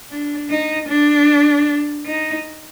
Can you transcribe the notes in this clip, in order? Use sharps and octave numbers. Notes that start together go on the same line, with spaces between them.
D4
D#4
D4
D#4